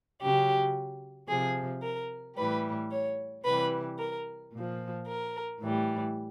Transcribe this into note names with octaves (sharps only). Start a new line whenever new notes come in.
C#3 F#3 G4
C3 F3 G#4
A#4
A2 E3 G3 B4
C#5
C3 E3 G3 B4
A#4
A#2 F3
A#4
A2 E3 G3